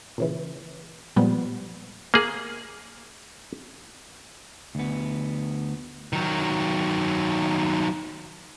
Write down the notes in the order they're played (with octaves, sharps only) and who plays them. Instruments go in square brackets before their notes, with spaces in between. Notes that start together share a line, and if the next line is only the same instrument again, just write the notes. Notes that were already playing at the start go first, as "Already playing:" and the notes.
[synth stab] A#2 C#3 E3
A#2 F3 G3 G#3 B3
[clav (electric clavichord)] A#3 G#4
[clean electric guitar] D2 B3
[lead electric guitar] D#3 F#3